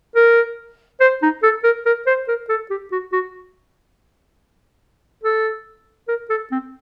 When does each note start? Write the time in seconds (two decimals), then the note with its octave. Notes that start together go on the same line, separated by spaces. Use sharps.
0.16 A#4
1.00 C5
1.22 D#4
1.43 A4
1.64 A#4
1.86 A#4
2.07 C5
2.28 A#4
2.49 A4
2.70 G4
2.92 F#4
3.12 F#4
5.23 A4
6.08 A#4
6.30 A4
6.51 C4